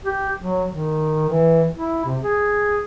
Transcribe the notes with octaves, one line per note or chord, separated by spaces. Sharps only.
G4
F#3
D#3
E3
E4
C3
G#4